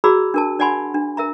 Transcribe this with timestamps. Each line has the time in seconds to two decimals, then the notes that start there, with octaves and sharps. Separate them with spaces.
0.04 F#4 G#4 D5 A#5 B5 E6
0.34 D4 A#4 A5
0.59 D4 D5 F#5 G#5 B5 C6
0.94 D4
1.17 A#4 E5 A#5